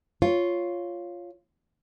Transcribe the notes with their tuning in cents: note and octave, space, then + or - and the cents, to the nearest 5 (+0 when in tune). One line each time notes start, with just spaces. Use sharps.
F4 +0 C#5 +0